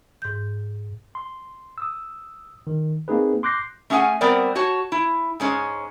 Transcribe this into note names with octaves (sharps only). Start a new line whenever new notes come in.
G#2 G6
C6
D#6 E6
D#3
A#3 C4 D#4 G#4 B4
C6 D6 F#6 G6 A#6 C7
A3 C#4 G#4 E5 F#5 G#5
G3 B3 C4 A#4 D5
F#4 C#5 A5
E4
G#2 G#3 C#4